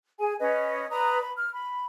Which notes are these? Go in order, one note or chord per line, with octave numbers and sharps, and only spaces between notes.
G#4 G#5
C#4 B4 D#5
B4 D5 A#5 D#6
B5
F6
B5